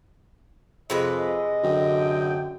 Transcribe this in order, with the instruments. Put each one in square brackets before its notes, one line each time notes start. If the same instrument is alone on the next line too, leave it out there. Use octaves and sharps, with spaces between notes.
[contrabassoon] F2 [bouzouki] C3 G#3 B4 [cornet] D#5
[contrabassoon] F#2 [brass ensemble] D3 G5